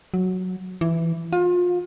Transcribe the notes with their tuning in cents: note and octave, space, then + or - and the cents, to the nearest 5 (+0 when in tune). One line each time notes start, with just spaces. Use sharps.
F#3 -5
E3 +10
F4 +30